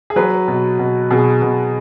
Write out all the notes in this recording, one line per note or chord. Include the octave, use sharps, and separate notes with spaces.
G#4
F#3 B4
B2
B2
B2 G#4
B2